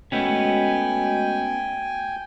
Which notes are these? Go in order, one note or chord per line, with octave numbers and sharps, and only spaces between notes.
G#3 A3 B3 C#4 F#4 D#5 G5 G#5